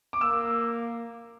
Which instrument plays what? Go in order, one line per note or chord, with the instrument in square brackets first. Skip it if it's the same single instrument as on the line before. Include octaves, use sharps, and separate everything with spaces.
[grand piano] D6
[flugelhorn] A#3 [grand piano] E6